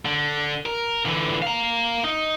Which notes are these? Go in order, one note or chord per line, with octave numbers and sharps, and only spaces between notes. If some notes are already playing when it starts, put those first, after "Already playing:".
D3
A#4
D3 E3
F5 A#5
D#4